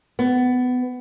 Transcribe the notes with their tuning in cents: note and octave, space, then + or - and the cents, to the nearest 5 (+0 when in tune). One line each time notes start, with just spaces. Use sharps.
B3 +20